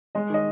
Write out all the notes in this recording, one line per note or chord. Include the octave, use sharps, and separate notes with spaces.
G#3 D#5
D#3 D#5